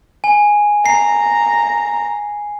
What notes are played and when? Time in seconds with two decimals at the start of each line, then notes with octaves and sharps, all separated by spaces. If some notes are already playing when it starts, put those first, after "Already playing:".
0.24 G#5
0.86 A#5 C7